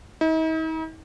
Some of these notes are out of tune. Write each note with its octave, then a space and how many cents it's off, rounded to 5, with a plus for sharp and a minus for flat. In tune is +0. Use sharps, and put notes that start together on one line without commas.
D#4 +45